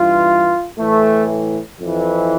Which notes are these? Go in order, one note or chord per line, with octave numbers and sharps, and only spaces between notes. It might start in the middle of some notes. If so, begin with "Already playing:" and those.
Already playing: G2 E3 F4
A2 E3 A3
F2 E3